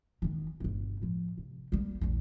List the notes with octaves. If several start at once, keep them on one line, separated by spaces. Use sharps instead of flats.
D#3 B3
G1 B2
A2 F3
C3
G3 A#3
A#1 E2